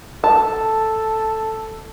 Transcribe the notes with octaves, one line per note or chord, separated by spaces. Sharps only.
A4 A5